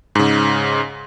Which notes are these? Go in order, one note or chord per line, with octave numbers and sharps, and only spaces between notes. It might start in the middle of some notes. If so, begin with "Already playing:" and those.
G#2 C#3